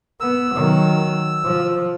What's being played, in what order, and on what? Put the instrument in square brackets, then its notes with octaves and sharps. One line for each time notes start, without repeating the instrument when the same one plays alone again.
[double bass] B3 [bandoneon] E6
[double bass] D#3 F#3
F3